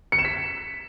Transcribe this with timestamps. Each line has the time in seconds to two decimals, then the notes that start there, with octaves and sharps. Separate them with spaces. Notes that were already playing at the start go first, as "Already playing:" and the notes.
0.12 C#7
0.18 E7
0.25 B6